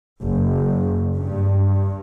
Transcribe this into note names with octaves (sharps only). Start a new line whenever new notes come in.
F#1
G2